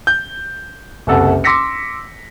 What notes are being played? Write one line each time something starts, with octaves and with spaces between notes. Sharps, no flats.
G6
F#1 C2 A4 F#5
C6 D6 E6 A#6 B6 C#7